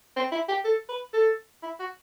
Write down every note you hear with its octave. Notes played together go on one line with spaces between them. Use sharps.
C4
E4
G4
A4
B4
A4
E4
F#4